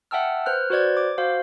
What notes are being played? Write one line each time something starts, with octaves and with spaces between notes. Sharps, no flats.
E5 F#5 G5 A5 E6 F6
B4 C5 F6 F#6
F#4 B4 C5 D5 G#6
D6
F#4 C5 F5